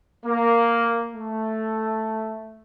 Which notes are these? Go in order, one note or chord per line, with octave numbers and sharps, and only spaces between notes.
A#3
A3